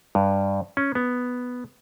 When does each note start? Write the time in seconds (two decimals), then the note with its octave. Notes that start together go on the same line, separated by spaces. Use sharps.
0.15 G2
0.77 C#4
0.95 B3